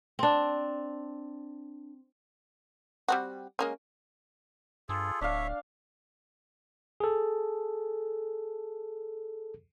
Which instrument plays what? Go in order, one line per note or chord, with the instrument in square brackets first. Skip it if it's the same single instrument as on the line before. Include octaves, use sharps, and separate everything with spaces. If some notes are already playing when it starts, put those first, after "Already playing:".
[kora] C4 D4
[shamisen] G3 C4 F#4
G#3 A#3 C#4
[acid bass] G2 [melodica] F4 G#4 A4
[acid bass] D1 [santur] D4 F5 [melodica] C#5 E5
[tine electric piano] G#4 A4